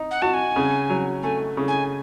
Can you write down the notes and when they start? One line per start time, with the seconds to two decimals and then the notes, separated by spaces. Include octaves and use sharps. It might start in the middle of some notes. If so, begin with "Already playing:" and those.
Already playing: D#4
0.11 F#5
0.22 F#4 A5
0.34 G#5
0.56 C#3
0.89 F#3
1.23 A3 G#5
1.57 C#3
1.68 G#5